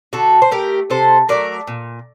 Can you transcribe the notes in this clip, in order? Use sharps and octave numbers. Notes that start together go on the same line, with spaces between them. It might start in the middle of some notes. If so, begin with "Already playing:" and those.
D3 F#4 A4
C5
A3 G4 A#4
C3 A4 C5
F#3 A3 A#4 D5
A#2